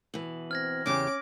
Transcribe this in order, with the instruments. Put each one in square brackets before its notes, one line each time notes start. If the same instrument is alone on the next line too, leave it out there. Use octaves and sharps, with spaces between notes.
[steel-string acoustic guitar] B2 E3 [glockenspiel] F#7
[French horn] C4 [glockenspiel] F6 G#6 A#6
[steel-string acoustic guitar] E2 C#3 G4 [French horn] C#4 [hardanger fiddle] D6